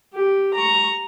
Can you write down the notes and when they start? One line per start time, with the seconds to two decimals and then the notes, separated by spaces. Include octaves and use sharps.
0.14 G4
0.54 A#5 C#6